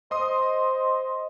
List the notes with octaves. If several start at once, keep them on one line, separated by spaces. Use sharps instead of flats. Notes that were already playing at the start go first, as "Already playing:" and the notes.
C5 D#5 C6 D#6